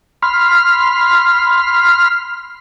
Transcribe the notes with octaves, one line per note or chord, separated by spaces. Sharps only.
B5 C6 F6